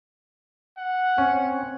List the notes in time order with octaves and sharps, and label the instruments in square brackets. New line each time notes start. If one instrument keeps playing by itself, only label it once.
[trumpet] F#5
[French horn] C4 [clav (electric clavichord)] C#4